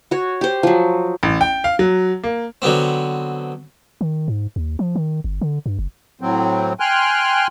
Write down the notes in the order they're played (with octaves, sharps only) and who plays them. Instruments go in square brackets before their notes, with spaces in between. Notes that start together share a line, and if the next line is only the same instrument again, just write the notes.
[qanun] F#4 C#5
G4 C5
F3 F#3
[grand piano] A1
G5
F5
F#3
A#3
[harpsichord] D3 F#3 B3 C4
[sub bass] D#3
G#2
D#2
F3
D#3
G1
D3
G2
F#1
[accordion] A2 F#3 C4
G5 G#5 C6 F6 F#6